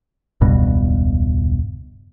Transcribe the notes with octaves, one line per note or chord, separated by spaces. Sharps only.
E1 C#2 G2 B2